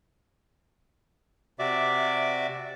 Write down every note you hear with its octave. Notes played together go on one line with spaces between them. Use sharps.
C3 F#4 D5 E5 D6